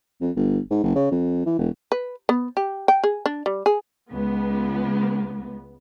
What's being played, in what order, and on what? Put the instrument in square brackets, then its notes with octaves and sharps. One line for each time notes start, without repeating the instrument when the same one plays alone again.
[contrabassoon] F2
G1
G#2
F#1
C#3
F2
E3
E1
[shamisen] B4
B3
G4
G5
G#4
D4
G3
G#4
[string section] C#2 B3